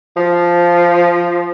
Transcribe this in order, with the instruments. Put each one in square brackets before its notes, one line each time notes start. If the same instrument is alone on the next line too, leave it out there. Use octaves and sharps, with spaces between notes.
[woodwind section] F3